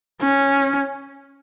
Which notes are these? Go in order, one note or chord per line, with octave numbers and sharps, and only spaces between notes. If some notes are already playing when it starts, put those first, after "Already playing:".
C#4